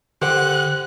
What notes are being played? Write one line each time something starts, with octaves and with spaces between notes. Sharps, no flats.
D3 G4 C5 F#5 F#6